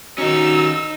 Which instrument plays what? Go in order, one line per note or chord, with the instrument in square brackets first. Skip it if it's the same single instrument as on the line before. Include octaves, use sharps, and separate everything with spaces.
[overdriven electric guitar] D#3 C#4 [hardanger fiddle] D#4 [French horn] F#4 [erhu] E6